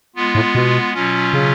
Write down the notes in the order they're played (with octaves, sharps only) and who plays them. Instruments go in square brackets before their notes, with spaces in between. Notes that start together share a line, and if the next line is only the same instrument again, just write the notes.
[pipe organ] G#3 B3 F4
[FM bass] A2
B2
[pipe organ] B2 F#3 C#4 F4
[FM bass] C#3